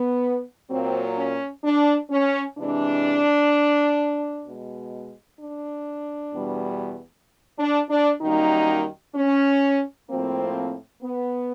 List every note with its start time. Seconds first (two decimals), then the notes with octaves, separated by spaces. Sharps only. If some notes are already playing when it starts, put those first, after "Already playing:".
Already playing: B3
0.70 A#2 F#3 A#3 C4
1.17 C#4
1.64 D4
2.11 C#4
2.58 C3 E3 G#3 D4
4.46 B2 G#3
5.39 D4
6.33 E2 B2 G3
7.58 D4
7.90 D4
8.21 F#2 D#3 G3 A#3 D#4
9.15 C#4
10.09 A2 F3 A#3 C4
11.02 B3